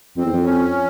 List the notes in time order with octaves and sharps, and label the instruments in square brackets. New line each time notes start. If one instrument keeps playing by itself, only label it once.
[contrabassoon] F2 [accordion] C4
[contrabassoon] E2
F2
[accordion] C#4